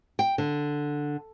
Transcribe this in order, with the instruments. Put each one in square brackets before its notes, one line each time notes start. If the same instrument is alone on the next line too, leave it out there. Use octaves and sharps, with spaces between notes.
[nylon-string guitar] G5
D3